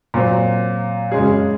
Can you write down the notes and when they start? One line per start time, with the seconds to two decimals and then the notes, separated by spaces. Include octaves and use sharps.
0.14 A#2 F#3 C4
1.12 F#2 C#3 G#3 C#4 G#4